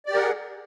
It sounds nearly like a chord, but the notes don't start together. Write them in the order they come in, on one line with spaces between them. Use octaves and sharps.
D5 G4 A#4 F#5 G#4